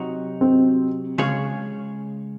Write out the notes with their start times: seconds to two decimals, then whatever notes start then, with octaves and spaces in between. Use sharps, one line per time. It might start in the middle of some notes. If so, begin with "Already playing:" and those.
Already playing: C3 F#3 D#4 F#4
0.41 C4
1.18 C#3 G#3 C#4 G#4 C#5